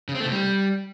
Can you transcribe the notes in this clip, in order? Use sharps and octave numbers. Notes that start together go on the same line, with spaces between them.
C#3
C4
A3
C3
G3